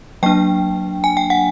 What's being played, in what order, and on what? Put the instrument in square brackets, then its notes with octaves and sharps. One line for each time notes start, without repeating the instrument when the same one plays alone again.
[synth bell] F#3 A#3 D4 G5
G#5
G5
F#5